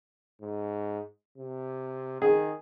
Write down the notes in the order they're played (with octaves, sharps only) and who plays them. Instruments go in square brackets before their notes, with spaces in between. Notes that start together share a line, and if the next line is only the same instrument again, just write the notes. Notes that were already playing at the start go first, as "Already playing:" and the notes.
[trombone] G#2
C3
[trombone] D#3 [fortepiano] G#4